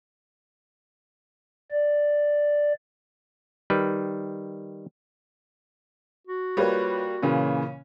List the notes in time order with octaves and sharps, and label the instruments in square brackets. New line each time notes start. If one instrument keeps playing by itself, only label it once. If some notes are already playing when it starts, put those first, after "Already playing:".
[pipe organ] D5
[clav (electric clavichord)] D#3 G3 B4
[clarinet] F#4
[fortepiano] G3 A#3 [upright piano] F4 B4 C#5
[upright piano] A#2 C#3 E3 [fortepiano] C#4